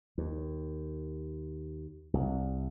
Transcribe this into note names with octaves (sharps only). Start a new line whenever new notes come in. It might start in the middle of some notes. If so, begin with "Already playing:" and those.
D#2
C2